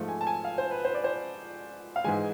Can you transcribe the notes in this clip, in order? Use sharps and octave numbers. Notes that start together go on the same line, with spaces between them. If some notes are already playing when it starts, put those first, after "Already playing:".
Already playing: G#2 F3 A3
G#5
A5
G#5
F5
C5
B4
C5
D5
C5
F5
G#2 E3 G#3 G#5